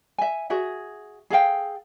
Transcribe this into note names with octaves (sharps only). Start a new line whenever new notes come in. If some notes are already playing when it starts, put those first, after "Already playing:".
E5 G#5
F#4 G#4 E5
G#4 A4 F5 G5